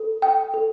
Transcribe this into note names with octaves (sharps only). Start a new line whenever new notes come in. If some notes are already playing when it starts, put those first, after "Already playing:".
Already playing: A4
G5
A4